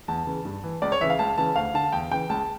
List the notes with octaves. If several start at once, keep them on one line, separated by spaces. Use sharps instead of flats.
E2 A5
C#3 E3
G2
E3
C#2 D5
C#5
C#3 E3 E5
F5
C#2 A5
C#3 E3 A5
D2 F5
D3 A5
E2 G5
C#3 E3 G5
C#2 A5